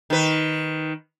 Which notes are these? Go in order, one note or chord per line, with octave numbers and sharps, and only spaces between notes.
D#3 B4